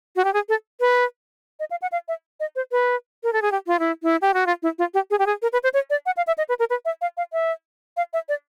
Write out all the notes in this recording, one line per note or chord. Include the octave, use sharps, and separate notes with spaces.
F#4
G4
G#4
A4
B4
D#5
F5
F#5
F5
E5
D#5
C5
B4
A#4
A4
G#4
G4
F4
E4
E4
G4
F#4
F4
E4
F4
G4
G#4
G4
G#4
A#4
B4
C5
C#5
D5
F#5
F5
E5
D#5
B4
A#4
B4
E5
F5
F5
E5
F5
E5
D5